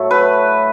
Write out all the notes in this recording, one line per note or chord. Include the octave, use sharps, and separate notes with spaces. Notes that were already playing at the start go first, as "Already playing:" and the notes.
Already playing: A2 F#3 A3 E5
B4